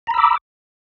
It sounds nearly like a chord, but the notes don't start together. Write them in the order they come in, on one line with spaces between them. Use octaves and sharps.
A#5 B5 E6 D6